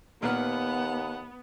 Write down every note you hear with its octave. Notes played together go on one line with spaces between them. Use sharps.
D#2 A#2 B3 B4 F#5 F6